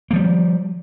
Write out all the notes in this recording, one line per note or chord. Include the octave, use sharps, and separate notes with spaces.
F3 G3 A#3